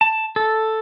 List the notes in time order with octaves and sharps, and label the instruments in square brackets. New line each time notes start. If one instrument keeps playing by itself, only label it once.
[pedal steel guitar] A5
A4